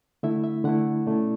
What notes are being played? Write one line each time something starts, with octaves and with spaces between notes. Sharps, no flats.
D3 A3 E4 E5
E5
D3 A3 E4 F#5
B2 A3 C#4 E4 D5